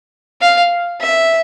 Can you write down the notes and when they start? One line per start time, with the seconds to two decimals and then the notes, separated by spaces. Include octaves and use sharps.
0.41 F5
1.01 E5